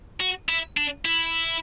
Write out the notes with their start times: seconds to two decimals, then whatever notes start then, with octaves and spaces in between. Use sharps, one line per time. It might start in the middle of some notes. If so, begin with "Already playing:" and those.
0.21 F#4
0.49 E4
0.77 D4
1.05 E4